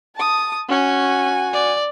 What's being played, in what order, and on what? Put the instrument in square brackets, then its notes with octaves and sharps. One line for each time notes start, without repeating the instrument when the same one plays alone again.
[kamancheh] A5 D#6
[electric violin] C#4 [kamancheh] F#4 G#5
[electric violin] D5